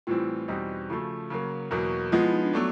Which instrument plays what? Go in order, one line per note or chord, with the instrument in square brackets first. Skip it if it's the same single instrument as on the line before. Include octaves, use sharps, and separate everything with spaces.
[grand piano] A2 E3 G3 C4 [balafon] F4
[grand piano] E2 B2 G3 C4 D#4
[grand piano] C#3 F3 A3 [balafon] F#4
[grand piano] C#3 F#3 A#3
E2 B2 F#3 A#3
[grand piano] F3 G#3 B3 [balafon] F4
[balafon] E4
D#4
D4
[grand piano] F#3 A3 D4 [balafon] B3